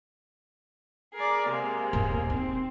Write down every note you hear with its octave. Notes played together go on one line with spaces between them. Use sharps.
G#4 A#4 D5
C3 G#3 A#3
D#1 G2
C4 D#4